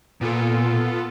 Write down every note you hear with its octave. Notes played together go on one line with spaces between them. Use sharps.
A#2 B3 F4 A4